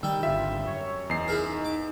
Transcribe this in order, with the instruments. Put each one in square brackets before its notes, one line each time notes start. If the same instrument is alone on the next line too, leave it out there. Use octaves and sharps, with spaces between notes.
[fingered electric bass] D#3 [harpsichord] G3 G5 [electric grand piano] E6
[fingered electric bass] G#1 D3 [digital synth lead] F4 [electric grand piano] E5
[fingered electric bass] F#2 [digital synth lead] C#5
[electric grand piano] E2 C7 [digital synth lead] D#4
[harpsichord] E4 G#4 A#4
D6